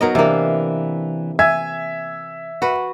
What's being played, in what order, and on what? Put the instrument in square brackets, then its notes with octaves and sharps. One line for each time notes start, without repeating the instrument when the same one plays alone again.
[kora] F#3 A#4 D#5 [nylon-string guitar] B3 D#4
[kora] C3 A#3 [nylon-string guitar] E3 D4
[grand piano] E5 G#6 [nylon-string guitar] G#5
[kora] F#4 B4 [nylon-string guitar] F#5